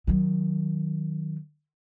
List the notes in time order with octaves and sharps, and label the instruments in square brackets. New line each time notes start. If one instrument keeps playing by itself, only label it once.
[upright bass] D#3 F#3